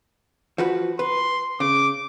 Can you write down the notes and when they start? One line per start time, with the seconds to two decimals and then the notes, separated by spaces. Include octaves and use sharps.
0.58 F3 F#4 B4
0.99 B4 C6
1.60 C#3 D6